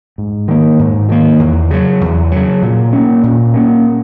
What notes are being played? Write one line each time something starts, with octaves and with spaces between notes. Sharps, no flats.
G#2
D#3 A#3
G#2
D#3 A#3
E2
C#3 F#3
E2
C#3 F#3
A#2
A#3 C#4
A#2
A#3 C#4